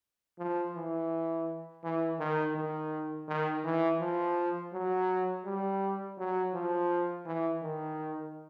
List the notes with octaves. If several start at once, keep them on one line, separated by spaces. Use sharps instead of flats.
F3
E3
E3
D#3
D#3
D#3
E3
F3
F#3
G3
F#3
F3
E3
D#3